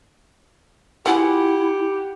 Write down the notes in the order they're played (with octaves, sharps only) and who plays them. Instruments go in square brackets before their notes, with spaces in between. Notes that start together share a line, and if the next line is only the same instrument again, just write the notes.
[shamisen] B3 F4 G#4 [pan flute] E4 [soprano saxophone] G4 [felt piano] F#5